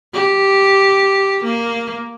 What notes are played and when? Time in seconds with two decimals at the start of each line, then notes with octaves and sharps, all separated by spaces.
0.13 G4
1.44 A#3